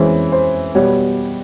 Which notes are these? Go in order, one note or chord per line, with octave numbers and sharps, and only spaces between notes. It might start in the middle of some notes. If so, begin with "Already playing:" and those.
Already playing: E3 G#3 C#4 C5
C5
B2 G3 B3 C#5